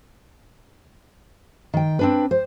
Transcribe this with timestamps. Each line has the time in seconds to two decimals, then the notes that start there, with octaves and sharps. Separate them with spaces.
1.74 D#3 G5
1.99 C4 D4 B4
2.31 C5